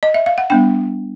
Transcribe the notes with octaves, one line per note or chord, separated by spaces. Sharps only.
D#5
E5
F5
F#5
G3 B3 D4 G5